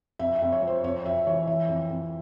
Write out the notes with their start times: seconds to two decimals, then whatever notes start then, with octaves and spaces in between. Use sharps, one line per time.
0.19 F2 E5
0.36 E5
0.42 F2
0.52 C#5
0.62 F3
0.67 C5
0.84 F2 C#5
1.06 F2 E5
1.27 E3 C#5
1.47 E3 E5
1.69 F2
1.90 F2